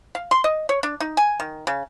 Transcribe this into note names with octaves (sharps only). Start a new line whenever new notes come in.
F5
C6
D#5
C#5
D4
D#4
G#5
D#3
C#3